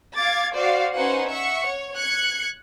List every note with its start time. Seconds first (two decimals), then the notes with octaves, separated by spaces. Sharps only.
0.16 F5 D6 G#6 A6
0.54 F#4 C5 D5 F5
0.93 C#4 D#4 B4 C5 F#5 G#5
1.30 E5 F#5 C#6 C#7
1.67 C#5
1.96 F#6 G#6 C#7